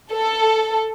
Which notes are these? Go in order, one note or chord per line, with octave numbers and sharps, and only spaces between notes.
A4